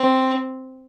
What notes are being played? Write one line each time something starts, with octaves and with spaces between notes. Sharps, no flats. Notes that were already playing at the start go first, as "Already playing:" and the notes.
Already playing: C4